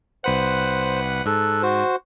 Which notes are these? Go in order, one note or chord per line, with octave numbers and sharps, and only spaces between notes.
C2 B4 C5 F#5
G#2 A4 F#6
F#4 C5